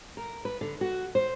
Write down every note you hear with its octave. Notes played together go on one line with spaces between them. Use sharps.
A#4
B4
D3
F#4
C5